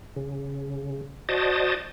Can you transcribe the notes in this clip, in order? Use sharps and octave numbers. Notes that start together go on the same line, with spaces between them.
C#3
F#4 C5 D5 D#5 A5 D#6